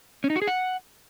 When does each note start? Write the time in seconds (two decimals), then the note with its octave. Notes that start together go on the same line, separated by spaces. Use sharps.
0.24 C#4
0.30 D#4
0.36 F#4
0.42 G#4
0.47 F#5